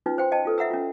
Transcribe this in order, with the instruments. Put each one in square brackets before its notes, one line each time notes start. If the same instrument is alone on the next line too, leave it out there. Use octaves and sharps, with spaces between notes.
[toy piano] C#4 D#4 F4 B4
C5 G5 C6
D#5 G5 A5
F4 A4 B4
E5 F#5 A#5 E6
C#4 F4